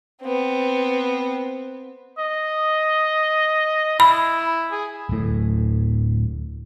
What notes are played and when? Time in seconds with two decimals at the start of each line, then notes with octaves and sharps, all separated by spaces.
0.22 B3 C4
2.18 D#5
4.00 E4 B5
4.72 G#4
5.09 D1 A2